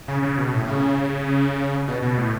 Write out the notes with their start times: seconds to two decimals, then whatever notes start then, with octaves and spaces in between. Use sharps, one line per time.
0.08 C#3
0.22 C#3
0.38 B2
0.53 A2
0.68 C#3
1.88 B2
2.02 B2
2.18 A2